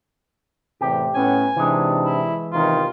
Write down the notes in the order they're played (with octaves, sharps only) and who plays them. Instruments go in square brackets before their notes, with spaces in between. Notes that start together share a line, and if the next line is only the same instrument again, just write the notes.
[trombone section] E2 A2 C3 [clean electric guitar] G4
[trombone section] A2 B3 C#4 [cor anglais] G#5
[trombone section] C3 D4 D#4 [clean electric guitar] E3 G#3
[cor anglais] E4
[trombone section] E2 C3 D#3 [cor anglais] F4